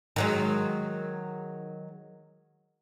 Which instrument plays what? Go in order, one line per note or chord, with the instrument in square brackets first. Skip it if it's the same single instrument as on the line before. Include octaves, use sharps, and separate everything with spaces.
[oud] D#3 F#3 G#3